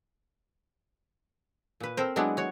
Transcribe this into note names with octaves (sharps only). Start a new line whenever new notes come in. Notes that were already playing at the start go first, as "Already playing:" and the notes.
A#2 B4
C4 A4 A#4 C5
F#3 G#3 B3 D4 E4 F#4
F#4 C#5